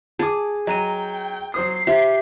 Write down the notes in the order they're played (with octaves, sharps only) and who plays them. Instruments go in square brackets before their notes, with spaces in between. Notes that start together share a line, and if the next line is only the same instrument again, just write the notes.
[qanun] G#4 [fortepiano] A5 D6
[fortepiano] F#3 [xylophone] D#5 A#5 D#7 [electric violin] G5
[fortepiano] F#3 C5 D#6 [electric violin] C7
[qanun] G4 [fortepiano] C5 [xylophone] E5